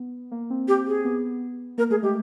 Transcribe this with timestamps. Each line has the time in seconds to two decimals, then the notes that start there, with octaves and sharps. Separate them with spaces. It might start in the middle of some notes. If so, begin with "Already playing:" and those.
Already playing: B3
0.31 A#3
0.50 C4
0.68 G4
0.87 G#4
1.05 B3
1.78 A#3 A#4
1.90 A3 G#4
2.03 G#3 G4